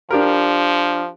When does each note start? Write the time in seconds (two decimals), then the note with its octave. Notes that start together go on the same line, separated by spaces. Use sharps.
0.11 F3 D4 G4 A#4